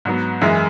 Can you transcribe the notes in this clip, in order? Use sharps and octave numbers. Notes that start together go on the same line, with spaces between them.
G#2 F#3 B3
F#2 E3 G#3 E4